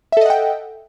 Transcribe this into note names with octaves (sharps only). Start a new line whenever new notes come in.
A4 D#5 E5 F#5 G5